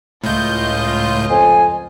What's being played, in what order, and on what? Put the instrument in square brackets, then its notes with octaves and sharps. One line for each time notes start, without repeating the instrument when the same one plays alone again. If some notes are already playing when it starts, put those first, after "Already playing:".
[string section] C#2 F4 D#5 [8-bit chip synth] A2 G6
[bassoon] F2 [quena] G#5